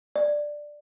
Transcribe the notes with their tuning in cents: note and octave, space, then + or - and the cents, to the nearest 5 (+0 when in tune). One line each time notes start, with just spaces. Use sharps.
D5 +10